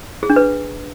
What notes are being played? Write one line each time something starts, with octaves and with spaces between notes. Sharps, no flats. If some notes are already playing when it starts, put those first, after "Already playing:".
G#4
D4
B4